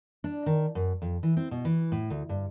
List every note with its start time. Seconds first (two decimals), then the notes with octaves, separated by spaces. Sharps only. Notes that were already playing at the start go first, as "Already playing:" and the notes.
0.24 D4
0.46 D#3
0.75 F#2
1.02 F2
1.23 E3
1.37 C4
1.51 B2
1.65 E3
1.92 A2
2.10 D2
2.29 G2